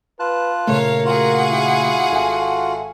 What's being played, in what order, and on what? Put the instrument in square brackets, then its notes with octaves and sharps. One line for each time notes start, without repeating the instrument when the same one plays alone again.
[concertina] F4 A5 F#6 [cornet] B4
[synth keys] A#2 C#3 A3 [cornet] A#4 [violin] C#5 F5
[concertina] F4 F#4 [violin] G#4 F#5
[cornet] E4
[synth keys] G#1 E5 G#5 [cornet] A4